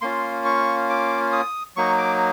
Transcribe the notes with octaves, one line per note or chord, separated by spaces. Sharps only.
A#3 C#4 F4 C6
C#6
D6
D#6
F#3 A#3 D#4 C#6
D6